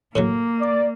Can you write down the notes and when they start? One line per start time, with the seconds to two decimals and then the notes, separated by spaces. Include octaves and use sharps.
0.16 A2 C#3 F#3 A#3
0.60 D5